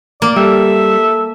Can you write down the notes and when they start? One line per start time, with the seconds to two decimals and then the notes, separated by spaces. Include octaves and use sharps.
0.22 A#3 D5
0.36 G3 A4 E5